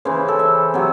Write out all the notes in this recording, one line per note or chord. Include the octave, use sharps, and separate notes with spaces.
C#3 E3 C5
A4
E5
C3 F#3